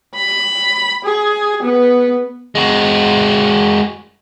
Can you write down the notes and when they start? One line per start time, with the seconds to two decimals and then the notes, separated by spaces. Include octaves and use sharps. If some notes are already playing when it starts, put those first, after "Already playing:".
0.16 B5
1.04 G#4
1.63 B3
2.55 G#3 F#4